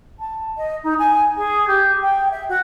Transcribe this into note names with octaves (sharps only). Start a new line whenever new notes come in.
A5
D#5
D#4
G#5
G#4
G4
G5
E5
F#4